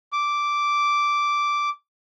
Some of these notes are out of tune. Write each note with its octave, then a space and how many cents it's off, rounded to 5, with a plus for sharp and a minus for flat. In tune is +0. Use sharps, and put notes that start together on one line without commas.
D6 -5